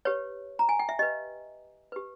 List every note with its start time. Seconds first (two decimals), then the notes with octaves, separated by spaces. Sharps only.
0.05 G4 B4 C#5
0.59 A#5
0.69 G#5
0.79 G5
0.89 E5
0.99 G4 B4 D#5
1.92 G4 B4